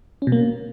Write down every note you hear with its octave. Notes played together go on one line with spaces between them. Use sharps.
C#4
B2
A#3